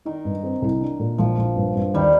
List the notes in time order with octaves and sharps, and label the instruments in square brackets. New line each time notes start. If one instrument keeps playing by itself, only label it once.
[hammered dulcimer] D#3 [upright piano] D#4
[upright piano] G2
C4
C2
D4
A#2
[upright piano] A#1 [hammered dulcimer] F3
[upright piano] A#1
G2
G2
[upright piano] D#2 [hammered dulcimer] D#3 G3